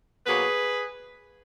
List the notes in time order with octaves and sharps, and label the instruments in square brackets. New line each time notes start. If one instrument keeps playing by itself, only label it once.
[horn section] B2 F#3 A#3 G#4 B4